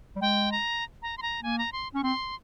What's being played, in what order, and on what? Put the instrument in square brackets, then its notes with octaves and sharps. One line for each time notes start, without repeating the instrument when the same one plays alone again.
[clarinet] G3
[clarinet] G#3 [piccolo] G5
[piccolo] A#5
A#5
C6
A#5
[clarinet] A#3 [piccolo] G#5
[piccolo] A#5
C6
[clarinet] C#4 [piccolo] C#6
[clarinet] C4 [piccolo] C6